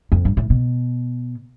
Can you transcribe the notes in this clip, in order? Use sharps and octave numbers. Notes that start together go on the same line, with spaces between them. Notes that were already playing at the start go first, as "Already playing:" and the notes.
F2
G2
A2
B2